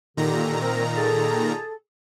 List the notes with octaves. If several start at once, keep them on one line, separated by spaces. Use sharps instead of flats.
A#2 D3 D#3 G4 A#5
C4 A#4
G#4 A4